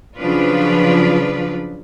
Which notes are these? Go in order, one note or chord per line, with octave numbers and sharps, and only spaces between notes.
C#3 F3 F#3 D4 F4 B4